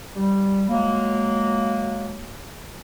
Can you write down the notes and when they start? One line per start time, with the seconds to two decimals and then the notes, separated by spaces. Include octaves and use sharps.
0.15 G3
0.69 F#3 G#3 A#3